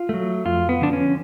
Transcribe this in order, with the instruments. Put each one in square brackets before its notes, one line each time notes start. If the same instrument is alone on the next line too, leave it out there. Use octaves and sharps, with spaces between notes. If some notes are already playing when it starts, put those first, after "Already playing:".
Already playing: [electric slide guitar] F4
F#3 A3
F2 F4
B3
D3 F3 D4
C#4